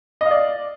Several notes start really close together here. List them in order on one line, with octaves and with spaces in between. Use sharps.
D#5 F5 D5